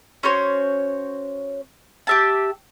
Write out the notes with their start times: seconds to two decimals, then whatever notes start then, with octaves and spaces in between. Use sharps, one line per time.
0.23 C#4 F#4 C5 C#5
2.07 G4 E5 A5